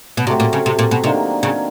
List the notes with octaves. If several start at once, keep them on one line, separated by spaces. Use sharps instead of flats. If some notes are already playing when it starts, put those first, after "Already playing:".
B2
C3 F#3 A3 C4
A#2
C#3
C3
A#2
B2
C3 D#3 F#3 A#3 D4
C#3